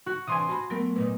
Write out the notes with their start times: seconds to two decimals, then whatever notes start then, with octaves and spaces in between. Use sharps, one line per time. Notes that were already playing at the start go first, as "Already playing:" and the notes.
0.06 F#4
0.27 C3 E3 D4 G#5 C6 D#6
0.49 F#4 C5 A5 B5
0.70 F#3 A3 B3 A#4
0.96 F#2 A#2 D#4 B4